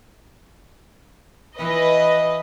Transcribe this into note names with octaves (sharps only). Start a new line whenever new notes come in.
E3 B4 D#5